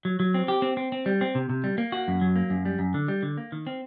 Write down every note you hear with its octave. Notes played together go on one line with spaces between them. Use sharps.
F#3
F#3
C4
G4
C4
C4
C4
G3
C4
C3
C3
G3
A#3
F#4
F#2
F#3
A#3
F#2
G3
F#2
D3
G3
D3
A#3
D#3
C4